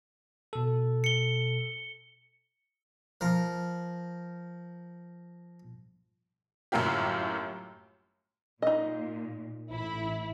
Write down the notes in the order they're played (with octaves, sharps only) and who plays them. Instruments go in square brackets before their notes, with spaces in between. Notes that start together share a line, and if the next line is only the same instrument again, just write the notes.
[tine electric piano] B2 A4
[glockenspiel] C#7 G7
[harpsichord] F3 A#4
[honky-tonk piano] G1 F#2 A2 A#3 F4 G4
[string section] A#2 [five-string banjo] D#4 D#5
[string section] A1 E4